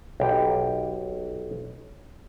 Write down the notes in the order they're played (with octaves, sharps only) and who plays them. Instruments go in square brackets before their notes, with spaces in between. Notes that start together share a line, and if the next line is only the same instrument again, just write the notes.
[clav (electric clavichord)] B1 G4